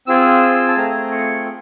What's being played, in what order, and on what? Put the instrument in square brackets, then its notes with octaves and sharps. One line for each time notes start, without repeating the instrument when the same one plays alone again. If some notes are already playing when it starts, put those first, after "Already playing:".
[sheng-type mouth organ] C4 F4 G#4 E6
E6
A5
A3 C4 F4 G#4 A#5
C#6